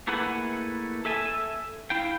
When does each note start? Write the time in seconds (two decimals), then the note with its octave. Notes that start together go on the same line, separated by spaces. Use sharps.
0.07 A3 A#3 E4 G#4 B4 F#5
1.05 A4 E5 G#5 A5
1.90 E4 F5 G5